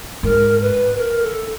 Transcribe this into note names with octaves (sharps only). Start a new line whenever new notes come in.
G#2 A#4
B4
A#4
A4